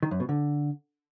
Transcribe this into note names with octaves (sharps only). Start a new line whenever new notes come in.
D#3
F#2
B2
D3